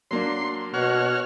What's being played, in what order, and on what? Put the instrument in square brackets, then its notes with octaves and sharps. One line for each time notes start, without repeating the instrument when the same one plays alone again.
[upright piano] F#3 A#3 D4 [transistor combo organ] C6
[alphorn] B2 [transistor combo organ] F#4 C#5 F6